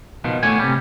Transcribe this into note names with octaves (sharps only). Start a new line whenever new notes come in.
B2 D#3 F3
A2 D3 A3 C#5 G#5
C3 G3